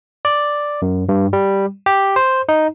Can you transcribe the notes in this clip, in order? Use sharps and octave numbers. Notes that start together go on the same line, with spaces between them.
D5
F#2
G2
G3
G4
C5
D#4